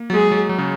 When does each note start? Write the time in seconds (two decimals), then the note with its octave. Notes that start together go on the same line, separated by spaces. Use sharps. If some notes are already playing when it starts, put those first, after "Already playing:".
Already playing: A#3
0.10 F#3
0.13 G#3 G#4
0.32 F#3
0.49 F#3
0.58 C#3